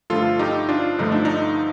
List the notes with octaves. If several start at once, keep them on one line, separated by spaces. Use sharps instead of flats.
G2 D3 F3 A3 F4 A4
D#4 G4
D4 F4
G2 D3 F3 A3 D#4
D4
D#4